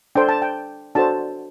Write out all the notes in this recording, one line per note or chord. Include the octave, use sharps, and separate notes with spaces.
D4 A4 C5 G5
A5
G5
D4 F#4 A4 C5 A5